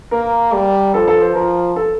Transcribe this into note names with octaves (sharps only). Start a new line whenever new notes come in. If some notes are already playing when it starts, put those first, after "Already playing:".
A#3 A#4
G3
F3 A4
A4
C5
F3 A#4
A4